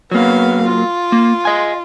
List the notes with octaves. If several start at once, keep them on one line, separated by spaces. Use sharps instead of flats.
F#3 A#3 B3 F5
F4
A#3
D#5 G#5